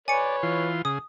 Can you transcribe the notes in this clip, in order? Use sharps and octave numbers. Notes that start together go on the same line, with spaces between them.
B4 C#5 D5 G#5 C#7
E3 F4 C6
C#3 G#4 D#6